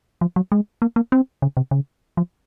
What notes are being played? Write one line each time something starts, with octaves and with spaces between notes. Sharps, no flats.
F3
F#3
G#3
A#3
A#3
C4
C#3
C3
C#3
F3